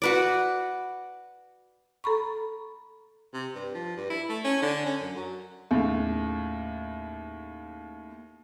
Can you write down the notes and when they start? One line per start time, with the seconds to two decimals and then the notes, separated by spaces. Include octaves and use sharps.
0.02 F#4 B4 D5
2.04 A4 A#5 B5 C#6
3.34 C3
3.55 G2
3.75 F3
3.97 G2
4.10 E4
4.29 A3
4.45 C#4
4.62 D3
4.86 C#4
5.02 F#2
5.17 F#3
5.71 D#2 A2 C#3